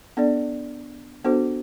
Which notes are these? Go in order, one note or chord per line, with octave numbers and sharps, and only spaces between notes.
B3 D4 A4 D5
B3 D4 F#4 A4 C5